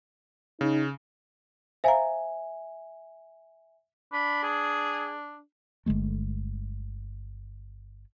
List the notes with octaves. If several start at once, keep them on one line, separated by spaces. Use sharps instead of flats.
C#3 D#4
C5 E5 F5 G#5 A#5
D4 B5
G#4
G1 D3 G#3 A3